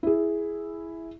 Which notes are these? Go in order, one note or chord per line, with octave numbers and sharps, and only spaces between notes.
E4 G#4